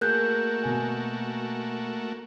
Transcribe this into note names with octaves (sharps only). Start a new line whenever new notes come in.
A3 A#3 F#4 G#4 A#4 F#6 G6
B2 G#5